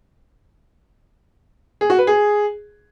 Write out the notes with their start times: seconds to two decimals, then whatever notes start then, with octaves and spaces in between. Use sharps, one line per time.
1.81 G#4
1.90 F#4
1.99 B4
2.07 G#4